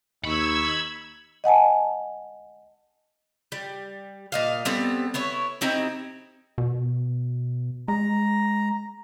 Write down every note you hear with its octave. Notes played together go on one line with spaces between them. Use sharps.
D#2 D#4 B5 C#6 E6 G#6
D#5 F#5 G#5 A5
G3
A#2 D#5 F5
G3 B3 C4 A4
B3 E4 C#5
C4 D#4 E4 G4
B2
G#3 A#5